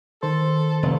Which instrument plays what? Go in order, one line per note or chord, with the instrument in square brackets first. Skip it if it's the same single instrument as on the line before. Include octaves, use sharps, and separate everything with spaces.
[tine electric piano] D#3 C5 C6 [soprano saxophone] A4
[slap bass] F1